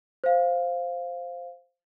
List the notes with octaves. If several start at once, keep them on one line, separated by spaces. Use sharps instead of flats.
C5 F5